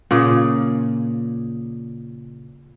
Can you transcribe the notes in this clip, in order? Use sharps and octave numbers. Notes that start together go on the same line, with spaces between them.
A#2 C#3 G#4